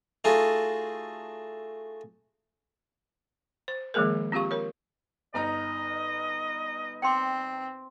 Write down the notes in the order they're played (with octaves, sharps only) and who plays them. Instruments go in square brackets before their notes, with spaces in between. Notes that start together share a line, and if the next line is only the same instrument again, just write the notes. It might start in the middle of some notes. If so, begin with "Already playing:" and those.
[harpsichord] A3 D#4 F4 F#4 G#4 A4
[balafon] C5
D#3 F3 G#3 A#3 G#4 A#4
C4 F4 G4 F5 C#6
A#4 C#5
[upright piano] G1 D#4 A#5 [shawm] D#5
[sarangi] C4 [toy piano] G5 C6 D6